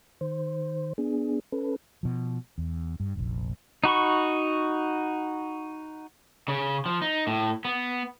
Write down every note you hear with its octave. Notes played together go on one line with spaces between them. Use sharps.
D#3 C5
B3 D4 G#4
C#4 A4 B4
B2 F3
E2
G2
F1 A#1
D#4 F#4 B5 C#6
C#3
F3
D#4
A2
B3